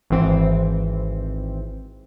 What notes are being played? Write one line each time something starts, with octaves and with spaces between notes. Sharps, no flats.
G#1 E3 C4